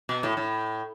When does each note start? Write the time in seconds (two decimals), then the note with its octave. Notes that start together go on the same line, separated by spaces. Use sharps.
0.09 B2
0.23 A2
0.37 A2